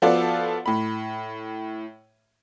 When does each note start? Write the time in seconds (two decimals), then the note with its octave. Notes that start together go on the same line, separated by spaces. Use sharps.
0.02 F3 B3 F4 F#4 A4 D5
0.66 A2 B5